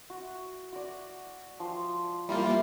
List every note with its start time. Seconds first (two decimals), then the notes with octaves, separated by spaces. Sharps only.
0.10 F#4
0.73 F#4 D5
1.60 F3 G5 C6
2.29 G3 A#3 E4 F4 A#4